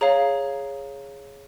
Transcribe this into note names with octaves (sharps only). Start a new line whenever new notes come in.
G#4 C#5 F5 A#5